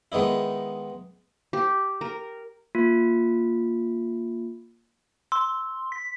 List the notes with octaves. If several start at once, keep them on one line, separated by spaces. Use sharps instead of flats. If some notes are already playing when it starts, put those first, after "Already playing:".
D#3 G#3 B3 D#4 E4
G4
A#4
A#3 F4
C6 E6
B6